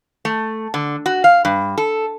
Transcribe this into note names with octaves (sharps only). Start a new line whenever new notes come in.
A3
D3
F#4
F5
G2
A4